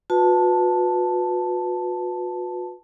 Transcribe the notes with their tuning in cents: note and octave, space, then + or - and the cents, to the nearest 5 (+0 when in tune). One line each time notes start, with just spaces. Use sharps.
F#4 -45 B4 +0 A5 +0